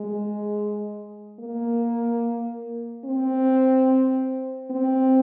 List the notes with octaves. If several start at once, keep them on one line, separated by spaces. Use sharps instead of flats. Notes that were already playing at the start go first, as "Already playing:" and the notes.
Already playing: G#3
A#3
C4
C4